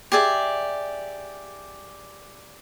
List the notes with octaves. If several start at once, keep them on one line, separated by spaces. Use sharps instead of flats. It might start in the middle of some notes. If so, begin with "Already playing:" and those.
G4 G#4 D5 E5